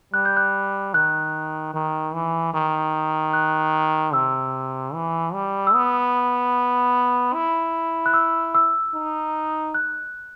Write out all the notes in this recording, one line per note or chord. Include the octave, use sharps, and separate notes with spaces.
G3 F#6
G6
F#6
D#3 F#6
D#3
E3
D#3
F#6
C3 E6
E3
G3
E6
B3 D#6
E4
F#6
E6
E6
D#4
F#6